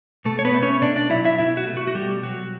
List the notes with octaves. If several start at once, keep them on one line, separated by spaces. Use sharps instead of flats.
B2 A3 A4
C#5
B3 B4
A3
C#4 C#5
B2 D4 D5
D4 D5
F#3 E4 E5
E4 E5
B2 E4 E5
F#4
A3
F#4
F#4
B2 G3 G4
F#3 F#4